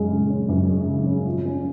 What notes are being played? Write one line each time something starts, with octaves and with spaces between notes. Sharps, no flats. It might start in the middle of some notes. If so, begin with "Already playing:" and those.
Already playing: F#2 C#3 G#3 C#4
C#3
C#4
F#2
G#3
C#3
C#4
F3
C#4